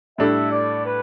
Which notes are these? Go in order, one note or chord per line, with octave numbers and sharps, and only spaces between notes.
A2 G3 D4 A4 E5
D5
B4